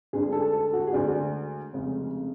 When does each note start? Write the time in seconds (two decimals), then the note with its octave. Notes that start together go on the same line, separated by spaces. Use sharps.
0.13 D2 D3 G#3 D4 G#4
0.32 A4
0.53 A4
0.73 F#4
0.87 G#4
0.93 D2 D3 G#3 D4 F#4
1.73 F1 F2 C#3 G#3